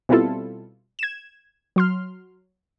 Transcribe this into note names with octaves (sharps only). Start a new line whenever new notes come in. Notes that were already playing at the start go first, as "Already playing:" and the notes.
B2 G3 C4 E4 F4 A4
G#6 E7
F#3 C6 F6